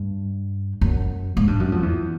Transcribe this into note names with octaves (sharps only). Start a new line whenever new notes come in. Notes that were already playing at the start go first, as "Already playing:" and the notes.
Already playing: G2
F#2
G#2
G2
F#2
F2
E2